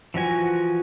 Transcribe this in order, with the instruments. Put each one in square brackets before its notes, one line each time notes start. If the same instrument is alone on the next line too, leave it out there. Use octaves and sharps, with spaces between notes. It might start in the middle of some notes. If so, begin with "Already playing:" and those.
[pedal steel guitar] E3 F3 F#4 G#5